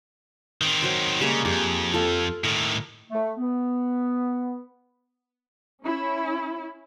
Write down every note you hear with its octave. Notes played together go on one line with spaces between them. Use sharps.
D#3 C4
F#3 C5
C#3 G3 G#3 A#3
F2 G4 G#4
F4 A4 F5
A2 D#3 A#4
A3
B3
C#4 E4